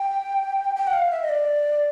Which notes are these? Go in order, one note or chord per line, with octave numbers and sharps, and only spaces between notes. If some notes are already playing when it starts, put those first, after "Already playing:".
Already playing: G5
G5
F#5
F5
E5
D#5
D5